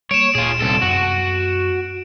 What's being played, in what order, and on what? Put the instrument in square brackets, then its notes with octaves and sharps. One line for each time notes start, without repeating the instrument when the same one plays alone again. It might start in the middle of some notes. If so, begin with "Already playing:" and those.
[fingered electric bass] G3 A#3 [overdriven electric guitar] C#5 [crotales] D7 E7
[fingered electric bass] D1 A#2 [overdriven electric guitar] F4 G#4
[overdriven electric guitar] C2 A4
[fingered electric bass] F#2 B3 [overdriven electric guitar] F#4